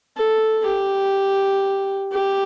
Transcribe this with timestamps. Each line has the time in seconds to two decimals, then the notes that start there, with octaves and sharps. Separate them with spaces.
0.17 A4
0.66 G4
2.13 G4